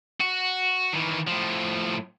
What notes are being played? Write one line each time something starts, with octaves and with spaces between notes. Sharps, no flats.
F#4
D#3 E3
A2 F3